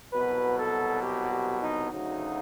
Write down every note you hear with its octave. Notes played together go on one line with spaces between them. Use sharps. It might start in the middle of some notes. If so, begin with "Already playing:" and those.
C2 B2 F#3 B4
A4
G4
G4
D#4
D2 C#3 F#3 D#4